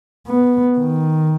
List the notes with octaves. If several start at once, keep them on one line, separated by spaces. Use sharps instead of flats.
B3
D#3